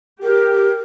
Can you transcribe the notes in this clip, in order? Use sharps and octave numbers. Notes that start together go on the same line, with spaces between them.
G4 A#4